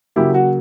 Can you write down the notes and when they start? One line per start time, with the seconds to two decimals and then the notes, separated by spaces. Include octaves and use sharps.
0.16 C#3 F#3 A#3 E4 G4
0.34 F#4